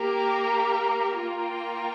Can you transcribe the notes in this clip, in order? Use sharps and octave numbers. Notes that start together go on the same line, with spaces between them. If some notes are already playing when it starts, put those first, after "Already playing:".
Already playing: A#3 G4 A#4
A#3 F4 A#4 G5